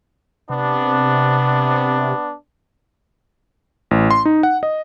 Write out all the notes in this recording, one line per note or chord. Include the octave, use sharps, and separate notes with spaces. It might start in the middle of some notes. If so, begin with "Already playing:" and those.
C3 B3 D4
A1
C6
D#4
F#5
D#5